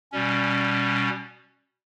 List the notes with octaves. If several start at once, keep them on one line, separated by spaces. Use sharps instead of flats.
B2 G3 C#4